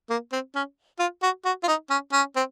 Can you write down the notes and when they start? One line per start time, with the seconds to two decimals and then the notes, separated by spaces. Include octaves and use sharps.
0.10 A#3
0.32 C4
0.55 C#4
0.99 F4
1.23 F#4
1.45 F#4
1.63 F4
1.68 D#4
1.90 C#4
2.12 C#4
2.36 C4